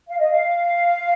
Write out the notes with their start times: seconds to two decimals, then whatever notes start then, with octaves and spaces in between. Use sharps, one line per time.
0.08 F5
0.18 D#5
0.29 F5